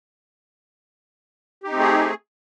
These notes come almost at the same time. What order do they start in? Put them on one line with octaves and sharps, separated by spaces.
G4 D#4 C4 A3 G#4